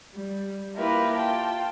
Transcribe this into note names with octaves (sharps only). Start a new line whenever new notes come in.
G3
A#3 E4 F4 G4 A#4 B4
F4 G5 A5